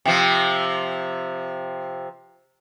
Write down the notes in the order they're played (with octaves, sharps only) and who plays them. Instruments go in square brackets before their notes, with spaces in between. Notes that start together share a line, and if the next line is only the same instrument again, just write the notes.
[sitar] C3 F3